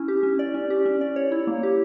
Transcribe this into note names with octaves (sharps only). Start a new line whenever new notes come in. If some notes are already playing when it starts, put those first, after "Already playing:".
Already playing: C#4 E4
G4
C#4
D5
C#4
G4
C#4
D5
C#5
E4
A#3
G4